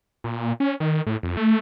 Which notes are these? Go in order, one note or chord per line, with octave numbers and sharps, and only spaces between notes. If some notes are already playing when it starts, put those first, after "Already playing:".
A#2
C#4
D#3
A2
F2
A3